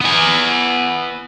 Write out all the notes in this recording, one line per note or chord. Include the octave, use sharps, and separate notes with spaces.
B3 G#5